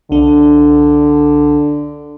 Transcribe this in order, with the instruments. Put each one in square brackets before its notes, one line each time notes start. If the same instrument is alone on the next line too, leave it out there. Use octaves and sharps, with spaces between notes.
[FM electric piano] C2 D4 [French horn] D3